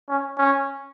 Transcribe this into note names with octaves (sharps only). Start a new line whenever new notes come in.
C#4
C#4